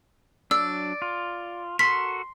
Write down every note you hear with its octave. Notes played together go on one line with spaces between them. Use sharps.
F#3 D4 D5 E6
F4
F#4 A4 A#4 C6 B6